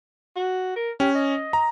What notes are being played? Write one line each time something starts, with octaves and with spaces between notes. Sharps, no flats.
F#4
A#4
C#4 G4
D#5
A#5